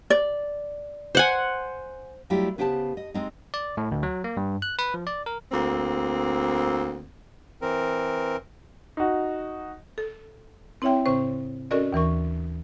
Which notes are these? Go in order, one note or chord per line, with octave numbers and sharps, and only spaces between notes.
D5
C5 F#5 G#5
F#3 G3 A3 E4 F4 G4
C#3 B3 G4 C5 F#5 A5
D#5
G#3 C4 D#4
D5
A2
D2
F#3
A#3
G2
F#6
B4
F3
D5
A#4
D2 A#3 C4
E3 C4 A#4
D#4 F#4
A4
C4 E4 C#5 E5 G5
A2 C#3 C4 C5 C#6
C#4 F#4 A4 A#4 D5 D#5
D#2 E3 A#4 C#6